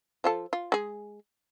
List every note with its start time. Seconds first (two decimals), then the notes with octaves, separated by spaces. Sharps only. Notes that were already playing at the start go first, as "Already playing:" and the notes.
0.24 F3 F4 A4
0.53 F4
0.72 G#3 G#4